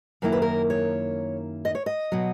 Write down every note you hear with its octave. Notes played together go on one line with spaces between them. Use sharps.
F#2 D#3 A#3 E4 A#4
B4
A#4
C#5
D#5
C#5
D#5
B2 F#3